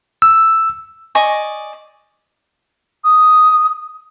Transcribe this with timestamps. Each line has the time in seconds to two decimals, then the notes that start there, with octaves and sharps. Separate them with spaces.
0.22 E6
1.15 D5 D#5 G#5 C#6
3.04 D#6